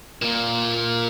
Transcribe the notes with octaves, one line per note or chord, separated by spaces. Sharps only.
A#2 A#3